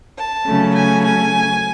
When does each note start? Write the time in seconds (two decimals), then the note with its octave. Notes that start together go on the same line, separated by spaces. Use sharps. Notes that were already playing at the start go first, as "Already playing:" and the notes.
0.18 A5
0.47 C#3 F#3 A3 C#4
0.75 G#5
1.05 G#5